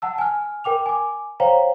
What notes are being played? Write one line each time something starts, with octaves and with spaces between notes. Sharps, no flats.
F#5 A5 E6
G#5 F6
A#4 G5 D6 F7
G#5 D6
C5 C#5 F5 G5 A#5